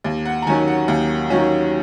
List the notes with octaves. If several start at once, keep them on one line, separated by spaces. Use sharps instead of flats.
D#2
F#5
A#5
D#3 F#3 C#4 G#5
F#5
D#2
D#3 F#3 C#4